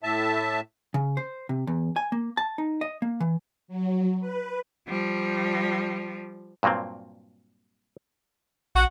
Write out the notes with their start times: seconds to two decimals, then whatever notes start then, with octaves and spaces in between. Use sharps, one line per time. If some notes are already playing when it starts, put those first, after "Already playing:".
0.03 A2 E5 A5
0.94 C#3
1.17 C5
1.49 C3
1.67 E2
1.96 G#5
2.12 A#3
2.37 A5
2.58 D#4
2.81 D#5
3.02 A#3
3.20 E3
3.68 F#3
4.20 B4
4.88 F3 G3
6.63 G2 A#2 F#3 A#3 C4
8.75 A#1 F#4 F#5